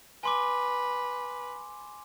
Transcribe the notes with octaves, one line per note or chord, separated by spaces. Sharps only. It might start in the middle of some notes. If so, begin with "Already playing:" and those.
B4 G#5 C6 D6